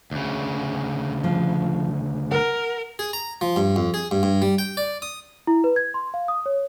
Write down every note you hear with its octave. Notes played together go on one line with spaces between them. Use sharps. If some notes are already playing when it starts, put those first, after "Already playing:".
D2 C#3
F3
A#4 F#5
G#4
A#5
F3
G2
F2
G#4
G2
G2
G3
G5
D5
D#6
E4
B4
G#6
C6
F5
D#6
C#5